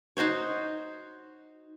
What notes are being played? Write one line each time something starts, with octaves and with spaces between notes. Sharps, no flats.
D#4 F#4 C5 C#5